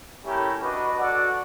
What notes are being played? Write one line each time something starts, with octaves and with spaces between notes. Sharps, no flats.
A3 C#4 E4 G4 A#4
D4 F#4 B4 D#5
F#4 A4 D5 F#5